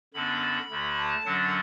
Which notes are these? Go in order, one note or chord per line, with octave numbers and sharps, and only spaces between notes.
F#2 D3 B3 D4 B5
D2 D3 A3
A5
F#2 D3 F#3 D4 F#5